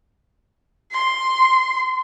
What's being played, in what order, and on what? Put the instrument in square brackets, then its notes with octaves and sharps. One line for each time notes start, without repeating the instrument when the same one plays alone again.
[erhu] C6